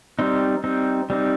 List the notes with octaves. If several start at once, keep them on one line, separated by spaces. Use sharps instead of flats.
G3 C4 D#4
G3 C4 D#4
G3 C4 D#4